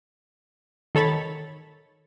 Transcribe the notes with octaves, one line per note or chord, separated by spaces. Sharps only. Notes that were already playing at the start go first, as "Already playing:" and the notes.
D#3 A4 C#5 B5 A6